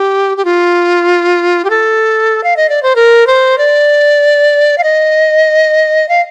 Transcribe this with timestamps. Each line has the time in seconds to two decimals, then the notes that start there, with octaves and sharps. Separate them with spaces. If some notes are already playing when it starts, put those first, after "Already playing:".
Already playing: G4
0.37 G4
0.45 F4
1.65 G4
1.70 A4
2.44 F5
2.57 D#5
2.70 D5
2.83 C5
2.96 A#4
3.27 C5
3.58 D5
4.78 F5
4.84 D#5
6.09 F5